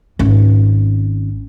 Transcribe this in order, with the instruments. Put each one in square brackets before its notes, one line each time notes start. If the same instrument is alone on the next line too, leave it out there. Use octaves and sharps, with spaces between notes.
[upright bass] G#1 C#4